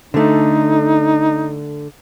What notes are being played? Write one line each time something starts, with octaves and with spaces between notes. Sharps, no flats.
D3 A3 D#4